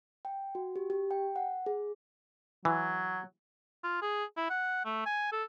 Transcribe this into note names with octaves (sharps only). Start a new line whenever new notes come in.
G5
F#4
G4
G4
G5
F#5
G#4
E3 F#3
F4
G#4
E4
F#5
A3
G#5
A4